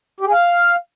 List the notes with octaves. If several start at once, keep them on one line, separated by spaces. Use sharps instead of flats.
G4
G#4
F5